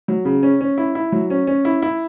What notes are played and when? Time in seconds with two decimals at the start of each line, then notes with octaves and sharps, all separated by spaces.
0.08 F#3
0.25 C#3
0.43 C#4
0.61 C#4
0.78 E4
0.95 E4
1.12 F#3
1.30 C#4
1.47 C#4
1.65 E4
1.82 E4